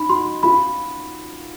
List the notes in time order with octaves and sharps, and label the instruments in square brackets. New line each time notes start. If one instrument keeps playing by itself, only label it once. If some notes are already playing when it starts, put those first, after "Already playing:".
Already playing: [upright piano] D#4 [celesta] B5
[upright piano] F#4 [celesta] C6
[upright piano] F4 [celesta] B5